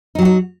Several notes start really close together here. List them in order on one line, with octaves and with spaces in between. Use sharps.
D#4 F#3 G4 F#4